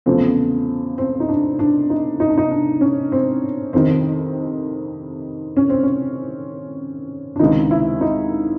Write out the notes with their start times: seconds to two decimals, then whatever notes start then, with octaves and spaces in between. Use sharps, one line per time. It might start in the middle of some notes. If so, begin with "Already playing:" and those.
0.06 E2 C#3 F3 A3 C4
0.98 C4
1.20 D#4
1.29 D4
1.59 D4
1.90 D#4
2.20 D#4
2.29 D4
2.37 D#4
2.51 D4
2.81 C#4
3.12 C4
3.73 F2 C3 D#3 C4
5.57 C#4
5.70 C4
5.83 C#4
7.36 D4
7.39 C#2 C3 D#3 D#4
7.71 E4
8.01 D#4